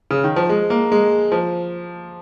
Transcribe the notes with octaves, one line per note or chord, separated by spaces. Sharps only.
C#3
D#3
F3
G#3
A#3
G#3
F3